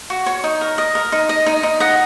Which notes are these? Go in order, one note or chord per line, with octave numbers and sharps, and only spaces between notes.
F#4
C#5
D#4
A#4
D#5
A#4
D#4
D#5
D#4
D#4
D#5 F#5